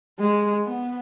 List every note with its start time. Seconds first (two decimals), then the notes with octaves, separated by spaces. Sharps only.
0.19 G#3
0.65 B3